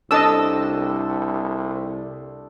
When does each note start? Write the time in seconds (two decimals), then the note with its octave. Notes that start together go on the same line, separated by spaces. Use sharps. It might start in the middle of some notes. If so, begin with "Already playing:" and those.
0.11 C2 D4 A4 C5 D#5 A5 E6